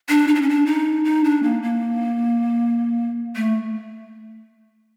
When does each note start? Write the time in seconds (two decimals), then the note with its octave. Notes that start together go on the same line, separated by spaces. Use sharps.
0.09 D4
0.28 D#4
0.35 D4
0.42 C#4
0.49 D4
0.66 D#4
1.05 D#4
1.24 D4
1.43 A#3
1.63 A#3
3.36 A3